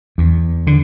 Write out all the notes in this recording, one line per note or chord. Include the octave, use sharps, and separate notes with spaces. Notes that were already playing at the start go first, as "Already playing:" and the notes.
E2
D3